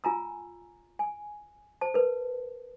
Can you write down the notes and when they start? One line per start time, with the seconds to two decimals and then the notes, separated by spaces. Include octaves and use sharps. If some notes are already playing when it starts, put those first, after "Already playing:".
0.04 F4 G#5 A#5 E6
0.99 G#5
1.81 C5 A5
1.94 A#4 B4